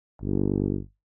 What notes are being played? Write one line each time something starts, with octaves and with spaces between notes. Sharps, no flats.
G1